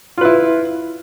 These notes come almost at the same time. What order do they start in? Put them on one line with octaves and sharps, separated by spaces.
F4 B4 E4